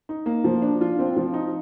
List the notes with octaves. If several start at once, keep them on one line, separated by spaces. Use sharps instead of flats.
D#4
A#3
F3
D4
F4
C4
F3
D#4